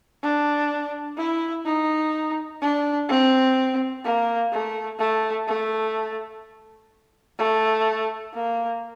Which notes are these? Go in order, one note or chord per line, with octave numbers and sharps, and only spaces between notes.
D4
E4
D#4
D4
C4
A#3
A3
A3
A3
A3
A#3